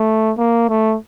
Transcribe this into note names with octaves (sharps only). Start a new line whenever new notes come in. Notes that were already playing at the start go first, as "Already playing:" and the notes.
Already playing: A3
A#3
A3